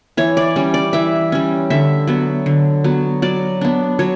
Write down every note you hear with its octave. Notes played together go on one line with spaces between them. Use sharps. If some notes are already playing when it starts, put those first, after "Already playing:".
E3 C#5
D5
G3 C#4
D5
E3 E5
G3 C#4
D3 E5
F#3 B3
D3
F#3 B3
F#3 D5
B3 D4
F#3 C#5